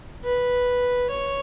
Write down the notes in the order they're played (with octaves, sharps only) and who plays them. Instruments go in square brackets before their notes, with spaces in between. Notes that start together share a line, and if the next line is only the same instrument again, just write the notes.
[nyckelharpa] B4
C#5